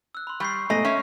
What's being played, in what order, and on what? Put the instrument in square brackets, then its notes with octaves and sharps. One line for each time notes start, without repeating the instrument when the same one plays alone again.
[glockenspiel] E6 F#6
B5 C6
[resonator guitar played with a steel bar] G3 [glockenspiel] C#6 G6 C7
[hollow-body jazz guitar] G#2 B2 A3 [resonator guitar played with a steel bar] D#5 [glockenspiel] G#5 A#5 C7
[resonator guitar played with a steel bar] C#4 [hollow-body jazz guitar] E5